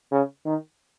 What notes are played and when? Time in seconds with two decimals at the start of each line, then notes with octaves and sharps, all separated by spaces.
0.11 C#3
0.45 D#3